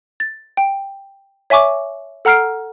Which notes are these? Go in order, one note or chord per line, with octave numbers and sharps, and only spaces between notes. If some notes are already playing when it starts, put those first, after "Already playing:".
A6
G5
C#5 E5 G#5 C#6 D6
A4 F#5 A#5 F6 C7 D7